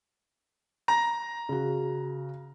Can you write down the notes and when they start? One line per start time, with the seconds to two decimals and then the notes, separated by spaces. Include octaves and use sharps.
0.88 A#5 A#6
1.49 C#3 F#4